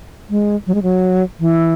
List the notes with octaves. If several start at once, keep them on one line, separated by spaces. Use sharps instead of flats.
G#3
F#3
G#3
F#3
E3